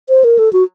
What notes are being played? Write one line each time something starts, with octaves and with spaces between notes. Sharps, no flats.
C5
A#4
A4
F#4